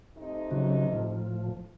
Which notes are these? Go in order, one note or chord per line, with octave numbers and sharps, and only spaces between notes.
C3 A3 D#4
C#3 F#3
A2 F3